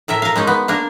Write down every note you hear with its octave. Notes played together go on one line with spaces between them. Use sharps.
A2 A4 A#4 E5
A#4 F5
G#3 C#4 D#4
B3
A#3 D4 A#4